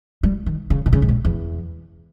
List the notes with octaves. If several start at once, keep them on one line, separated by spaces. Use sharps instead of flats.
G3
D#3
C#3
B2
C#3
G#2
A#2
E2